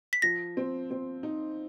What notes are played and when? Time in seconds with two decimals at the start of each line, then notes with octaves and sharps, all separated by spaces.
0.13 B6
0.22 F3 A#6
0.57 C4
0.91 C4
1.23 D#4